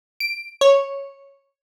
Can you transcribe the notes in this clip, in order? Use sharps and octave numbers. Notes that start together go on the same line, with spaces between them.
D7
C#5